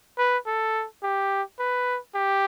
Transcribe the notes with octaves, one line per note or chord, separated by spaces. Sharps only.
B4
A4
G4
B4
G4